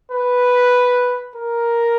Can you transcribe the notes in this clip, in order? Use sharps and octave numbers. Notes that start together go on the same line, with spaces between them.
B4
A#4